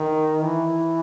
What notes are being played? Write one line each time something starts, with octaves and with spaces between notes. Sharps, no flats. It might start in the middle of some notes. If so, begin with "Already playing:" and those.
Already playing: D#3
E3